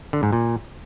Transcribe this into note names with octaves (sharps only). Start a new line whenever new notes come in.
D3
G#2
A#2